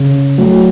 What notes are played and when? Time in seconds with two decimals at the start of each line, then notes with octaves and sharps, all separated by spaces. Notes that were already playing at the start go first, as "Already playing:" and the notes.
Already playing: C#3
0.38 F#3 A3